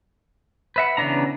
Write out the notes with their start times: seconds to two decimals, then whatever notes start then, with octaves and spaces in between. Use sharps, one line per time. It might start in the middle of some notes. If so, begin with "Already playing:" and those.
0.76 B4 E5 F#5
0.97 C#3 E3 B3 D4 A#5